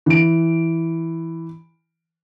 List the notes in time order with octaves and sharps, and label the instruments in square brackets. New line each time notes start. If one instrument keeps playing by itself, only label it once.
[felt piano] E3 D7